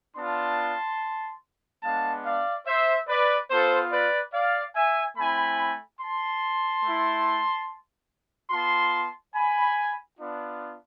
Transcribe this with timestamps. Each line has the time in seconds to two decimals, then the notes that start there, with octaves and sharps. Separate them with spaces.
0.16 B3 D4 F4 A5 C6
1.83 G#3 B3 D4 F5 A5
2.25 D5 F5
2.67 C5 E5
3.08 B4 D5
3.50 B3 F4 A4 C5
3.92 B4 D5
4.33 D5 F5
4.75 E5 G#5
5.17 A3 C4 E4 G#5 B5
6.00 A5 C6
6.84 A3 E4
8.50 B3 F4 A5 C6
9.34 G#5 B5
10.17 B3 D4 F4